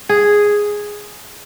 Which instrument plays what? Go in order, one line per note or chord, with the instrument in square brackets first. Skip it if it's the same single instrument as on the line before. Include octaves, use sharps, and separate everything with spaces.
[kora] G#4